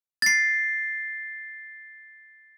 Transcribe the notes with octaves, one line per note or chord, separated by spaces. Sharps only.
A6 C7